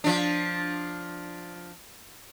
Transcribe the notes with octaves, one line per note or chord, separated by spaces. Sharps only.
F3 D4